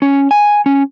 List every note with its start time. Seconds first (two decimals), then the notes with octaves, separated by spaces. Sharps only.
0.02 C#4
0.31 G#5
0.66 C#4